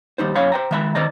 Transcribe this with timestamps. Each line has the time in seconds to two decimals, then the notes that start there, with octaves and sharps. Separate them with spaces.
0.18 D#2 G3 D#4 C5
0.35 F#2 C#4 C#5 F5 B5
0.52 C5 G5 A#5
0.71 D#3 G#3 E5 G#5 B5
0.95 D#3 C5 D5 D#5 A#5